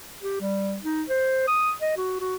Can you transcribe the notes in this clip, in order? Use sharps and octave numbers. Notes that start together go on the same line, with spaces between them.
G4
G3
D#4
C5
D#6
D#5
F#4
F#4